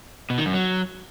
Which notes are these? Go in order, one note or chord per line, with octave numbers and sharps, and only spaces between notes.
B2
D#3
F#2
F#3